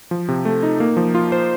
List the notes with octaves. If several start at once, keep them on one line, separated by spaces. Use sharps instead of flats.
F3
C3
A3
D#4
A#3
F3
F4
C5